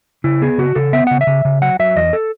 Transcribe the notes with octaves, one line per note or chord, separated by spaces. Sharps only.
C#3 E4
B3 G#4
C#3 F#4
C#3 A4
B3 E5
C#3 F#5
E5
C#3
C#3
F#3 F#5
F#3 E5
E2 D#5
A4